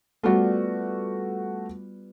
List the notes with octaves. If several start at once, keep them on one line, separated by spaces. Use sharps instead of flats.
G3 A3 B3 F4 F#4